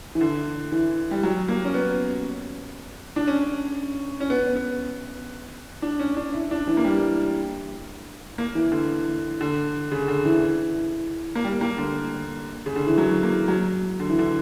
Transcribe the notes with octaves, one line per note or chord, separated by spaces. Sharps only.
E3
D3
E3
G3
F#3
A#3
C#4
B3
D4
C#4
C#4
B3
B3
D4
C#4
D4
E4
D4
E3
A#3
G3
A#3
E3
D3
D3
C#3
D3
E3
A#3
G3
A#3
D3
C#3
D3
E3
F#3
A#3
F#3
D3
E3
D3